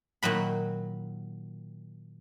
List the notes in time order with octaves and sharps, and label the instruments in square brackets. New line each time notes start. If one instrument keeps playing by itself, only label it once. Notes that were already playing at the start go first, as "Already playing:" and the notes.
[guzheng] A#2 D#3 F#3 B5